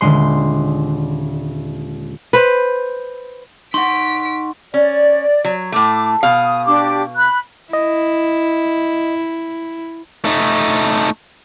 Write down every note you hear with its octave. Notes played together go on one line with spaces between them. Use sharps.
D#1 D3 G#3 C6
B4 C5
D#4 F#5 C6 C#6 B6 D7
C#4 D5
F#3
A2 A3 D6
B2 F5 D#6
D4 G4 D6
B5 F#6
E4 D#5
A3 D#4